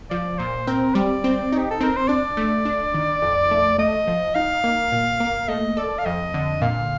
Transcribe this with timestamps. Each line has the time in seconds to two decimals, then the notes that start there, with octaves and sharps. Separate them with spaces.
0.10 F3 D5
0.38 A#2 C5
0.67 C4 A#4
0.95 G3 D5
1.24 C4
1.52 D#4
1.59 G4
1.71 A4
1.80 C4 A#4
1.97 C5
2.08 D4 D5
2.37 A3
2.65 D4
2.94 D#3
3.22 F2
3.51 A3
3.78 A3 D#5
4.07 F3
4.35 D#4 F5
4.64 A#3
4.92 A#2
5.20 A#3
5.48 A3 D#5
5.77 A4 D5
5.99 F5
6.05 F2 D#5
6.34 D3
6.61 A#2 F5